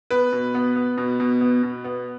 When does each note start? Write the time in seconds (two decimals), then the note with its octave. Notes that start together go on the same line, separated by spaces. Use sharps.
0.11 B3 B4
0.32 B2
0.55 B3
0.76 B3
0.97 B2
1.20 B2
1.41 B3
1.63 B2
1.84 B3